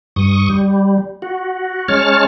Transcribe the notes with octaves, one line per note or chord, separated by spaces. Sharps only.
G2 C#6 D#6
G3
F#4
G#3 C#4 C#5 A5 F6